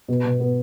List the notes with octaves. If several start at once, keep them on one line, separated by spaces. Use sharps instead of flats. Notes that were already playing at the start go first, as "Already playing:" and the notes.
B2
B2
B3